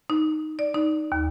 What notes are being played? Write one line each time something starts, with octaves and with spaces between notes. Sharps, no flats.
D#4
D5
D#4
D#2